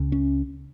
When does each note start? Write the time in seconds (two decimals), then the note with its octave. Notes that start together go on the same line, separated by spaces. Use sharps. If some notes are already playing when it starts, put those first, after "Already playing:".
Already playing: C#2 C#3
0.12 C#4